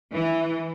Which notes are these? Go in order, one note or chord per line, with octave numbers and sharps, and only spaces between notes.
E3